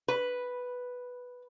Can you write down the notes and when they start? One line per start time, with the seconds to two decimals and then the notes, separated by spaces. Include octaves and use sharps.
0.08 B4